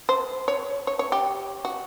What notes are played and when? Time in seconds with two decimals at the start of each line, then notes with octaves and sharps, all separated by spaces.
0.09 C5
0.48 C#5
0.87 C#5
0.99 C#5
1.12 G4
1.65 F#4